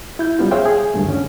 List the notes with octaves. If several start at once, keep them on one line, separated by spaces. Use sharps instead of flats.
E4 G6
F#3 G3 B3 C#4 F4
G#4 C5 C#5 E5 F5 G5
G#4
D2 G2 A3
D3 C#4